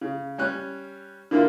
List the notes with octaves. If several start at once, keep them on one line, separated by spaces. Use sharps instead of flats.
C#3
G3 C#4 F#6
D3 A#3 E4 F4